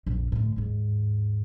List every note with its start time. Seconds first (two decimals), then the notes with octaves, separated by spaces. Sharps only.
0.06 A#1 F2
0.32 A2 D3
0.56 D#2 G#2